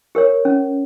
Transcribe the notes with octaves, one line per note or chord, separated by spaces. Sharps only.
G4 A#4 C#5
C#4